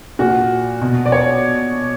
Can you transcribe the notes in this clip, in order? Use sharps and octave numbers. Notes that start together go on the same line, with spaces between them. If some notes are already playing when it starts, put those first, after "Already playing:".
A#2 F#4
B2
D5
C#5